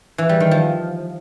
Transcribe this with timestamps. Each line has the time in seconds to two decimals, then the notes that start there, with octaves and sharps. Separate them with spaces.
0.18 E3
0.29 G3
0.40 D#3
0.51 F3